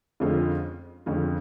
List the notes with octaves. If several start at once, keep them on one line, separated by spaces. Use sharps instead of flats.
F2 D3 G#3 C#4 F4
F2 D3 G#3 C#4 F4